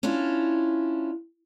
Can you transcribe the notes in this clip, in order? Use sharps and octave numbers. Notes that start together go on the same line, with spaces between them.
C#4 D4 E4 F4